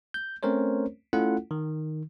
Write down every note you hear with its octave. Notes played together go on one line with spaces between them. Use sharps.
G6
A3 C4 C#4 A#4 C5 C#5
A3 C#4 E4 F4 A4 F#5
D#3